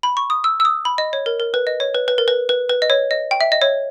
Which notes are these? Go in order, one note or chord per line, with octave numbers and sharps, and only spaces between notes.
B5
C#6
D#6
E6
E6
D#6
B5
D#5
C#5
A#4
A#4
B4
D#5
C#5
B4
B4
A#4
B4
B4
B4
D#5
C#5
D#5
G5
E5
D#5
C#5